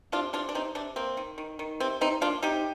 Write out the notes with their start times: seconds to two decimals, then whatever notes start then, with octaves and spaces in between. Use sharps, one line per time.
0.12 C3 D4 F4
0.33 C3 D4 F4
0.49 D4
0.55 C3 C4 D#4
0.75 C3 D4
0.96 A#3 C4
1.17 D#3
1.38 D#3
1.59 D#3
1.80 C3 C4
2.01 C3 C4 D#4
2.21 A#3 D4 F4
2.42 C3 D#4 G4